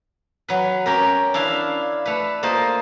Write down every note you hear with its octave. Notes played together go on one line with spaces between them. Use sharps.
F#3 B4
C#4 G4 A#4
D4 E4 F5
A3 B4
A#3 F4 A#4 C5 D#5